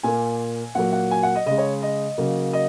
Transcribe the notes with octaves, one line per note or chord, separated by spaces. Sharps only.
A#2 A#3 G#5
A#2 F#3 A#3 F#5
F#5
G#5
F#5
D#5
C#3 G#3 D#5
C#5
D#5
C#3 F#3 A#3
D#5